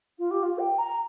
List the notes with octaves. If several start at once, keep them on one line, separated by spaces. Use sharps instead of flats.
F4
G4
F4
G5
A#5